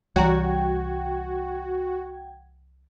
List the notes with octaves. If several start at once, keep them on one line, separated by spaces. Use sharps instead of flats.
C2 E3 G3 F#4 F#5 G5 A#5 G#6